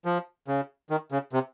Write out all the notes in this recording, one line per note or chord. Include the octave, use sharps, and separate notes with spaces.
F3
C#3
D#3
C#3
C3